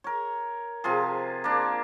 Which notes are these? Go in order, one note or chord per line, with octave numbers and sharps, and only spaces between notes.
A#4 C#5
C3 F3 F4 G#4
A#3 D4